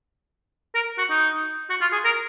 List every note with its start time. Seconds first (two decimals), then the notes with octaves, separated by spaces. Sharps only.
0.75 A#4
0.98 F#4
1.10 D#4
1.70 F#4
1.81 F4
1.92 G#4
2.05 A#4